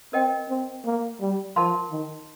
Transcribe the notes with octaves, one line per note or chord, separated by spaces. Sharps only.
C4 A#4 D#5 G5
C4
A#3
G3
F3 A#4 F5 A5 C6
D#3